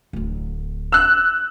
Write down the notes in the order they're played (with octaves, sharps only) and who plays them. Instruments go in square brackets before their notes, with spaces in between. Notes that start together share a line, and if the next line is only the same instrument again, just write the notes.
[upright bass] D1 D3
[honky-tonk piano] E6 F#6